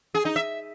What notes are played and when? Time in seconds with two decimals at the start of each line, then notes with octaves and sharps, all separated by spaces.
0.15 G#4
0.25 D#4
0.36 E5